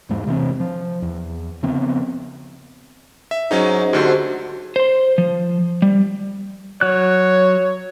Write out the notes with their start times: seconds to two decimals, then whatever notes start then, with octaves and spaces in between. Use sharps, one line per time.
0.09 E2 G#2 G#3
0.27 C3 E3 B3 C4
0.60 F3
1.02 E2
1.63 C#3 F3 B3 C4
3.31 E5
3.51 G#2 F#3 C#4 D#4
3.93 D2 D3 F#4 G4 C5
4.76 C5 C6
5.18 F3
5.82 G3
6.81 F#3 C#5 F#6